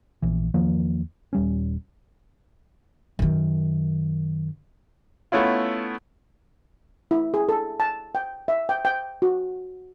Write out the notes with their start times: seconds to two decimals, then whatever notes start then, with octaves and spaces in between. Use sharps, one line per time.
0.22 A#1 E3
0.54 E2 D#3 F3 A#3
1.33 D#1 G3 C#4
3.19 F#2 D#3
5.32 A3 B3 C#4 E4 F4
7.11 E4
7.34 G#4
7.49 A4
7.80 A5
8.15 G5
8.48 E5
8.69 G5
8.85 G5
9.22 F#4